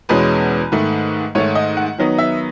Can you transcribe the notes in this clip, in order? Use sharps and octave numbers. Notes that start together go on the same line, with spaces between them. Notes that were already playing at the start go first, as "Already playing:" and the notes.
E2 B2 G#3 C#4 B4
G#2 D#3 A3
G#2 D#3 A3 C#5
D#5
F#5
D#3 F#3 B3 D#4
E5